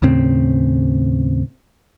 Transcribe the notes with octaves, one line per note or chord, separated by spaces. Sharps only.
D#2 A2 C#3 C4